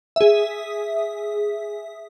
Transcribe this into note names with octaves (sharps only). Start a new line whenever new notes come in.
G#4 E5